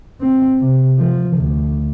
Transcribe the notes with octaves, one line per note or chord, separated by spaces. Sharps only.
C4
C3
F3
D2